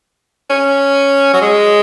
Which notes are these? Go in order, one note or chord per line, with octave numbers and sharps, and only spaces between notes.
C#4
F#3
G#3